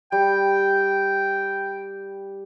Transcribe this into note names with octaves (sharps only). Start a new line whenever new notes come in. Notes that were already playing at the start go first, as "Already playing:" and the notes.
G3 G5